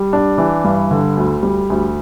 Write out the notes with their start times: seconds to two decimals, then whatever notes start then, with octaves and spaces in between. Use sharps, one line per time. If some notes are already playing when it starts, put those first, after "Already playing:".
Already playing: G3
0.13 D4
0.38 E3
0.64 G2
0.91 D3
1.17 D2
1.43 G3
1.70 D2